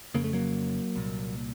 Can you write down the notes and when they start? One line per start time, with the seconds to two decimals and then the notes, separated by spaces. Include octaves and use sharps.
0.14 F2 C#3 A#3
0.24 A3
0.33 F#3 A#3
0.96 C2 A#2